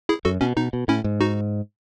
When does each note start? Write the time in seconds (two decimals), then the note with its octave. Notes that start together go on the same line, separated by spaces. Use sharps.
0.09 E4 G#4
0.25 F#2 F#4 A4
0.41 B2 C#4
0.56 B2 D#4
0.73 B2
0.88 A2 C#4 E4
1.04 G#2
1.21 D#4 F#4